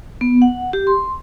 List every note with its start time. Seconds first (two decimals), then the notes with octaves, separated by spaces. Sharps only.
0.21 B3
0.42 F#5
0.73 G4
0.87 C6